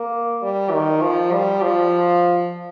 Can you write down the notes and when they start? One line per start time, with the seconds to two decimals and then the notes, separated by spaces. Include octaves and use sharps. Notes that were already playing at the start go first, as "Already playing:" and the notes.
Already playing: A#3
0.42 G3
0.72 D#3
1.02 F3
1.32 G3
1.62 F3